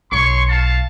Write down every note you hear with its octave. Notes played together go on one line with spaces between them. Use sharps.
B1 C#5 C6 C#6
F5 A5